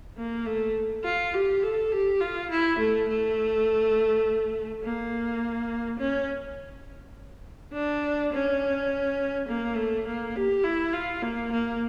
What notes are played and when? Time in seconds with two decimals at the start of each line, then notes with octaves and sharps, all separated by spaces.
0.17 A#3
0.46 A3
1.04 F4
1.34 G4
1.63 A4
1.92 G4
2.21 F4
2.50 E4
2.79 A3
3.08 A3
4.83 A#3
5.99 C#4
7.73 D4
8.32 C#4
9.48 A#3
9.77 A3
10.07 A#3
10.36 G4
10.64 E4
10.93 F4
11.23 A#3
11.52 A#3